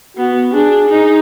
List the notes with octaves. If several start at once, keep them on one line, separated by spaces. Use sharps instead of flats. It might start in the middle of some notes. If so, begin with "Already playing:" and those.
B3 F#4
D4 G#4
D#4